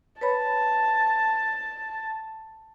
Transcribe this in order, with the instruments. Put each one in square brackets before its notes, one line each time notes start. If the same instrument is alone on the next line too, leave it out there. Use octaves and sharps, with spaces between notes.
[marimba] B4 C#5 B5 [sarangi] A5